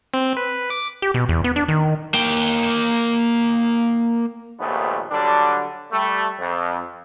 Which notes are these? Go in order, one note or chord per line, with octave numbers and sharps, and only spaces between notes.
C4
B4
D6
G4
B2
E2
B3
D4
D#3
A#3 G5
A#1 D#2 G#2 A3 B3
D3 F#3 G3 D4
G3 A3
F2